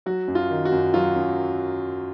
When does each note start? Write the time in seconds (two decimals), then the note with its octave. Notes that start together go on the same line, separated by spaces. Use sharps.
0.06 F#3 F#4
0.28 F#2
0.35 F4
0.50 D#3
0.65 F#4
0.72 F#2
0.94 F#3 F4
1.16 F#2